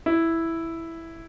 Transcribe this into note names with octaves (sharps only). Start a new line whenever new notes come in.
E4